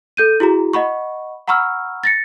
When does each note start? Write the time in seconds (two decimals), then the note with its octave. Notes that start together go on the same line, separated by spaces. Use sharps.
0.17 A4 G6 D#7
0.40 E4 F#4 G#4 A#5
0.73 D#5 F#5 B5 C#6
1.47 F#5 A#5 B5 C#6 E6 F6
2.04 A6 A#6 C#7